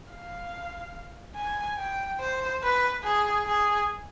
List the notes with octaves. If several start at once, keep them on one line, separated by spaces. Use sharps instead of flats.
F5
G#5
G5
C5
B4
G#4
G#4